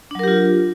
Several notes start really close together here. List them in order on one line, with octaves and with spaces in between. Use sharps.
D4 F#3 A#4 G4 F4